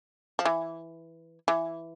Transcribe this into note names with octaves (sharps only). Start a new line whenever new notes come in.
F3
E3
E3